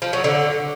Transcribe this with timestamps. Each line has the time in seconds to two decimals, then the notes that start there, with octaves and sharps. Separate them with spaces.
0.02 F3
0.13 F#3
0.24 D3